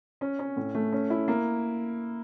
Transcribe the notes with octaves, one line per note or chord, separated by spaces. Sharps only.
C#4
C#4
A2
A3
C#4
E4
A#3